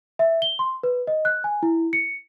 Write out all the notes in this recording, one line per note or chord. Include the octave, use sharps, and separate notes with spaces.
E5
G7
C6
B4
D#5
F#6
G#5
E4
C#7